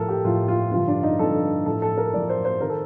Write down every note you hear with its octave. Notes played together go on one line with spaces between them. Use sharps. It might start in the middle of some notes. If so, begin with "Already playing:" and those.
Already playing: A2 F3 A4 A#4
G4
A2 F3 F4
F4
G2 D3 F3 F4
D4
D#4
G2 D3 F3 A4
A2 F3 A4
A4
A#4
A2 F3 D5
C5
C5
D#3 A#4
A4